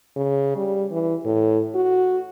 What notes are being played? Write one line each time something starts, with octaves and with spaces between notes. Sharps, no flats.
C#3
G3
E3
A2
F#4